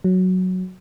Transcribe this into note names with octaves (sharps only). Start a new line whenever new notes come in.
F#3